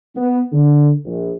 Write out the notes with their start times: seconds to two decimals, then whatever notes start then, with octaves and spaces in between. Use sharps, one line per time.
0.16 B3
0.52 D3
1.05 A#1